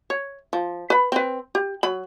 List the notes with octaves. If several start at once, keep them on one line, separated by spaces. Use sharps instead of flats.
C#5
F3
B4 B5
C4 B4
G4
F#3 B5